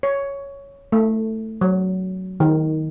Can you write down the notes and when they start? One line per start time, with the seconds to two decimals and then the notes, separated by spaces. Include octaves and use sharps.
0.03 C#5
0.92 A3
1.61 F#3
2.40 D#3